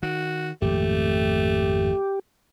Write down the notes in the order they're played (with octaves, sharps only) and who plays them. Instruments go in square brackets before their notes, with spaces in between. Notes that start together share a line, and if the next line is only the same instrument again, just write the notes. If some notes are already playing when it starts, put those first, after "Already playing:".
[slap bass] D#3 [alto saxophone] F#4
[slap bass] G#1 F2 A#2 [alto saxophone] A3 [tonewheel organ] G4